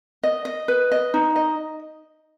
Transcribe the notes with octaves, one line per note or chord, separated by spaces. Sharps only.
D#5
D#5
B4
D#5
D#4
D#5